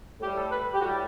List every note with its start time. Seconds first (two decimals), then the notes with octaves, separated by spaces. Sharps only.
0.21 A2 G4
0.24 G3
0.35 A4
0.51 B4
0.73 G4
0.80 A2 F#4
0.84 G3